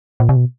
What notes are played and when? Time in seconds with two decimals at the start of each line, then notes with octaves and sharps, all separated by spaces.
0.20 A#2
0.29 C3
0.36 B2